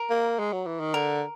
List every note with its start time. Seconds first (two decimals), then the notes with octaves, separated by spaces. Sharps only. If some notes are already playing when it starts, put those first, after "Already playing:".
Already playing: A#4
0.10 A#3
0.39 G#3
0.52 F#3
0.66 E3
0.80 D#3
0.94 D3 A#4